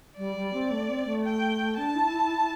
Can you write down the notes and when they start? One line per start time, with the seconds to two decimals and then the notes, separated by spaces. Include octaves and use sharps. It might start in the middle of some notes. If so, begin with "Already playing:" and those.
0.18 G3 D5
0.36 G3
0.53 C4
0.71 A3
0.89 C4
1.06 A3
1.24 G5
1.77 D4 A5
1.95 E4
2.13 E4
2.30 E4